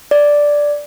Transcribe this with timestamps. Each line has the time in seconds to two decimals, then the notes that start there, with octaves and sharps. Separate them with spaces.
0.11 D5